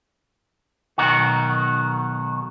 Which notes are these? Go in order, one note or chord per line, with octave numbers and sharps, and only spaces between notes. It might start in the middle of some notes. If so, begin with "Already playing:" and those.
B1 B2 D#3 F#4